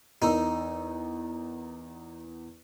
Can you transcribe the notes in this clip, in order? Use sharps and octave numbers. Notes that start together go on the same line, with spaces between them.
E2 D#4 A#4 E6